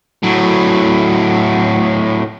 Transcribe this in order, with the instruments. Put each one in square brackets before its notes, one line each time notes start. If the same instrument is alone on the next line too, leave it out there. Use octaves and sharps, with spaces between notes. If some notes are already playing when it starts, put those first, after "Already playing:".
[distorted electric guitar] A2 F#3